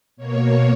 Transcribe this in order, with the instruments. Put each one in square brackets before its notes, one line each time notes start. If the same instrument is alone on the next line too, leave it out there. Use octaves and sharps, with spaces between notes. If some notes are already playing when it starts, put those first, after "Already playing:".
[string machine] B2 A#3 C#5